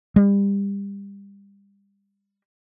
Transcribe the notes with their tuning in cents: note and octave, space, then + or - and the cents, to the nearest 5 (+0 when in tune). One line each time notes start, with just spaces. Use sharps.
G3 +30